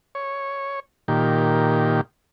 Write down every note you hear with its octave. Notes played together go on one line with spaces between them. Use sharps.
C#5
A#2 D#3 G4